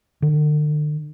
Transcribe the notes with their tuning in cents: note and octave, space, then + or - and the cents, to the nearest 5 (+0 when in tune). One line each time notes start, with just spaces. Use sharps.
D3 +40